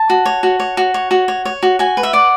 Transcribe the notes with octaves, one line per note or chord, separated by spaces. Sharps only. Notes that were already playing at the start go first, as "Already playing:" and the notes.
Already playing: A5
F#4
C#5
F#4
C#5
F#4
C#5
F#4
C#5
C#5
F#4
F#4 G#5
B4
E5
D5 F#5